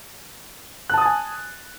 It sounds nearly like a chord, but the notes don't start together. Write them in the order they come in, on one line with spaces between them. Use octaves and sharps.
F#6 A5 D#6 A6 G#5